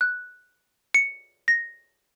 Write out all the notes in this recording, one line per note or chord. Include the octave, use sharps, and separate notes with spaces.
F#6
C#7
A#6